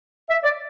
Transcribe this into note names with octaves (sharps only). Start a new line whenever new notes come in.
E5
D5